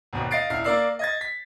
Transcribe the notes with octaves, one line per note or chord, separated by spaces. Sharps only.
G#1 D#2 B2
D#5 F5 A6 C7 D7
D#1 E4 F6 C7
A#3 A#4 D5 E6 C7
D#5 G#6 A6
B6